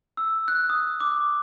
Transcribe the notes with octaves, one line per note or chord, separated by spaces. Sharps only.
E6
F#6
D#6
D6